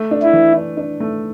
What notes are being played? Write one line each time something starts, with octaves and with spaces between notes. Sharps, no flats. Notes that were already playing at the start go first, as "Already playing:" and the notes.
Already playing: A3
D4
E4
E3
D4
D4
A3